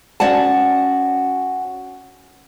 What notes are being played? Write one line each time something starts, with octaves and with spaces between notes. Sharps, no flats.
C#4 F#4 D5 F#5 A5